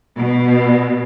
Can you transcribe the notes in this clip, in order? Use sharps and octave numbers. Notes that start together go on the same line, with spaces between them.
B2